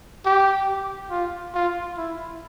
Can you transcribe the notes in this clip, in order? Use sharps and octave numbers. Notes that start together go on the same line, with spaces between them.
G4
F4
F4
E4